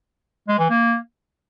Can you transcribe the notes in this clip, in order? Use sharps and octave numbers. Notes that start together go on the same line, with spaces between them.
G#3
E3
A#3